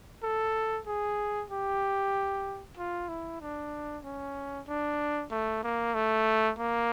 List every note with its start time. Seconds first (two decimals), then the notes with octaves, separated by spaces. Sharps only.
0.23 A4
0.87 G#4
1.50 G4
2.77 F4
3.09 E4
3.41 D4
4.04 C#4
4.68 D4
5.31 A3
5.63 A#3
5.95 A3
6.59 A#3